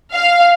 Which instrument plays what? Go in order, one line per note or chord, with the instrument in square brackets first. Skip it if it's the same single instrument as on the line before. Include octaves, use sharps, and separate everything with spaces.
[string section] F5